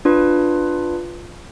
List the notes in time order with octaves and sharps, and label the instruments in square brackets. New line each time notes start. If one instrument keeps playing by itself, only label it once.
[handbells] D4 F4 B4